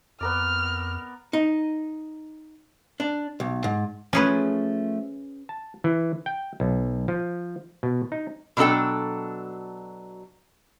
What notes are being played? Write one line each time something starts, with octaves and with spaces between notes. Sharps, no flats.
F2 B3 A#4 D5 F6
D#4
D4
B1
G#2
F3 A3 C#4 G#4 B4
A5
E3
G5
B1
F3
B2
D#4
B2 F#3 D4 A4 G5